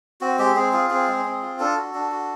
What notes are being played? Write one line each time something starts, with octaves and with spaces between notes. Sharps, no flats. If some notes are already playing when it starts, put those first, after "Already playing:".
C4 F#4
G#3 G4
C4 G#4
F4 G#4
C4 G#4
G#3
C4
F4
D4 A4
F#4
D4
F#4